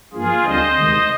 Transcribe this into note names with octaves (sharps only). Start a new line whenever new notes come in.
G2 F3 A#3 F4 G#4
D2 D3 G3 C4 C5 D#5
D2 C3 D#3 G#3